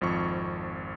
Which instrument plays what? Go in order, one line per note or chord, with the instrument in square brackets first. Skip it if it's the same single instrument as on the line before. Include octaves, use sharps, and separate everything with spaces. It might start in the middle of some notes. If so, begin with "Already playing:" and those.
[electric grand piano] G#1 F2 F3 C#6